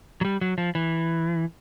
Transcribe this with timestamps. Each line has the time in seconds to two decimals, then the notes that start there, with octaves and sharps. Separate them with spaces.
0.21 F#3
0.25 G3
0.41 F#3
0.58 F3
0.75 E3